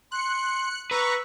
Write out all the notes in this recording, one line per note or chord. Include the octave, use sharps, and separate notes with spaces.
C6 F#6 C#7
B4 A#5 C#6 E6 F#6